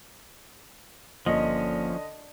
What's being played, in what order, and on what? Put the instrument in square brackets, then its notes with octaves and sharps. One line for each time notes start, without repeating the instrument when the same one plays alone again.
[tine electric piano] G1 A#3 [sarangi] D3 [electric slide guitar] F3 C#4 [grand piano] D#5